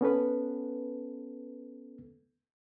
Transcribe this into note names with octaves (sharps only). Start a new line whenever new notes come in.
B3 C#4 A4 B4